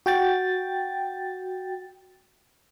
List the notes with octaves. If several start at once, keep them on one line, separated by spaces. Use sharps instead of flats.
F#4 G5 A6